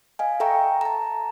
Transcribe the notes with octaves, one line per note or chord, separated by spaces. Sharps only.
D#5 F5 G#5
A4 E5 G5 A#5 C#6
A5 A#5